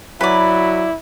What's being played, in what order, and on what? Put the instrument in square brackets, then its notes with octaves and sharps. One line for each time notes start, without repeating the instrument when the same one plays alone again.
[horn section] F#3 [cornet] E4 [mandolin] B4 D5